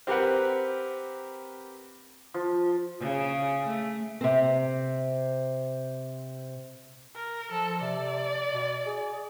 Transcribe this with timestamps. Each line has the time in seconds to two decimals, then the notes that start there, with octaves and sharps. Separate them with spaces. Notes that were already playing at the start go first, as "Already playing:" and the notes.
0.07 C4 G4 A#4 B4 F#5
2.34 F3
3.00 C#3
3.67 A3
4.21 C3 C4
7.15 A#4
7.52 F3 A4
7.81 C3 D5
8.52 B2
8.86 G#4